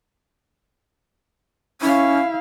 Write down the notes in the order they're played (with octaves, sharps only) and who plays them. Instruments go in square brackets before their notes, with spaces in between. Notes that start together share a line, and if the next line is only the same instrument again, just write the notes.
[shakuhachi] C#4 [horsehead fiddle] E4 F5